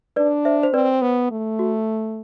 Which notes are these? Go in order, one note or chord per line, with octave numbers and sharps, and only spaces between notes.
D4 B4 D5
C5 E5
C5
C4 B4 D5
B3 C5
A3
F#4